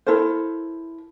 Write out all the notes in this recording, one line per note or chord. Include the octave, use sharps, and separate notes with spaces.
E4 A4 A#4 C5